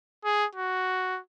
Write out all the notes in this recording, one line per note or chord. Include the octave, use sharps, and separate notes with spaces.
G#4
F#4